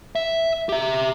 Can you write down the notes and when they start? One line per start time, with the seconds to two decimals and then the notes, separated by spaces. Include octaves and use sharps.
0.15 E5
0.69 G4 E5